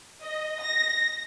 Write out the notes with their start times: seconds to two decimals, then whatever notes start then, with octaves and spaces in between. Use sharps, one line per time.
0.21 D#5
0.62 A#6